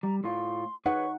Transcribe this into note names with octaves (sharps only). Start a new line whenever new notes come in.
G3 A#5
A2 F4 C6
D#4 G#4 B4 C#5 F#5 C#6